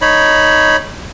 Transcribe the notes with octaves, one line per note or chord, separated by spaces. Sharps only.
D#4 C#5 B5